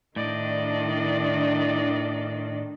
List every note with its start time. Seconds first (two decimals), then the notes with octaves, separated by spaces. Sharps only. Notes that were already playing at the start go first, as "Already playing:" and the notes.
0.16 A2 D#3 D4 E4 D5 D#5